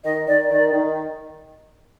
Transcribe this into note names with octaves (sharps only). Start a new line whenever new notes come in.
D#3 D#5
D#3 D5
D#3 D5
D#3